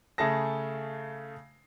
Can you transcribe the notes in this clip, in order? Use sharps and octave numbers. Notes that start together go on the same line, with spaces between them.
C#3 A3 G#4 A5 A#6